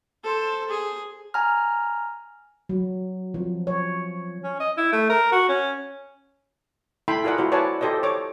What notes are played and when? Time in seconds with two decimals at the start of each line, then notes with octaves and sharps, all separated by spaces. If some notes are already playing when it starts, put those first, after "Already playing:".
0.23 A4 C5
0.69 G#4
1.34 G#5 A#5 F6
2.69 F#3
3.34 F3
3.67 C#5
4.43 C#4
4.60 D#5
4.77 E4
4.92 A3
5.09 A#4
5.32 F#4
5.49 C#4
7.08 E4 A4 G5 B5 C6
7.24 F4 G#4 A#4 D5 F#5
7.38 E4 F#4 C5
7.52 B4 C#5 D5 F#5 G#5 A5
7.81 G4 A4 C5 D5 D#5
8.03 C#5 D6